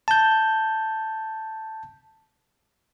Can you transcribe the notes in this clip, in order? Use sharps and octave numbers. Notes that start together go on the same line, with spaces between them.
A5 G6